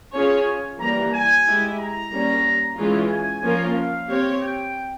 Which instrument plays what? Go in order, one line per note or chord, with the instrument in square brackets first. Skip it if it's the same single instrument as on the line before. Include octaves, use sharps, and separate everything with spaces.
[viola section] C#4 F4 G#4 C#5 [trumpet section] G#5
[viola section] E3 G3 A#3 [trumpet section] A#5
[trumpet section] G#5
[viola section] G#3 E4 G4
[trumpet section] A#5
[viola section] G3 A#3 C#4
E3 G#3 C#4 F4
[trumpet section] G#5
[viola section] F3 A#3 C#4 F4 A#4
[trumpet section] F5
[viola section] C4 G4 C#5
[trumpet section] G5